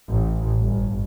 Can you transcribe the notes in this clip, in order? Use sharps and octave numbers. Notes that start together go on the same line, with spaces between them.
A1
G1